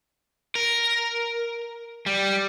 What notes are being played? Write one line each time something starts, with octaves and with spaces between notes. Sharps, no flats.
A#4
G3